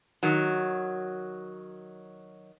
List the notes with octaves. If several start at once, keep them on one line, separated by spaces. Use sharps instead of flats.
D#3 F#3